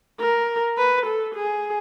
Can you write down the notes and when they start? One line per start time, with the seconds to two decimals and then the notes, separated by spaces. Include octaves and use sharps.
0.20 A#4
0.78 B4
1.06 A4
1.35 G#4